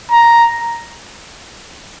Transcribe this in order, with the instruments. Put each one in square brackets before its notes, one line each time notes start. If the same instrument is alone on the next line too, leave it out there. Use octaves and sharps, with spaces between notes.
[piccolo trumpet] A#5